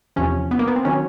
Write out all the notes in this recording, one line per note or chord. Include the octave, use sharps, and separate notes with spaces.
E2 C3 F3 C#4
B3
A#3
B3
C4
D#3 F#3 A#3 C#4